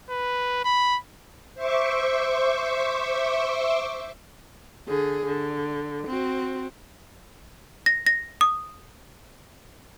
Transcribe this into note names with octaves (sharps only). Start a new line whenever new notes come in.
B4
B5
C5 E5 C#6 D6
D3 G#4
D3
C4 F#4
A#6
A#6
D#6